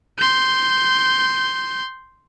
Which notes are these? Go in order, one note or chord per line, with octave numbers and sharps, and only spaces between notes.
C6 G6